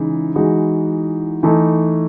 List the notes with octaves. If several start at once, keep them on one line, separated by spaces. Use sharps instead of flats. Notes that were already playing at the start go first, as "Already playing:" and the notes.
Already playing: C#3 E3 G#3 D#4
E3 G#3 D#4 F#4
E3 A3 D#4 A4